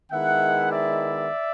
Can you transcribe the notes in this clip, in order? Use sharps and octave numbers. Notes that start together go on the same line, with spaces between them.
D#3 G#3 B3 E4 E5 F#5
D5 E5